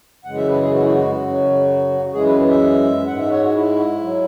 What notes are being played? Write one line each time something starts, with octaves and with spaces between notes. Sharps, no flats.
F#2 C#3 E3 G#3 F#5
E5
B4
G#4
F#4
E4
F#4
F#2 C#3 F#3
F#2 E3 G#3 G#4
B4
E5
G#2 G#3 F#5
E5
C#5
F#4
E4
F#3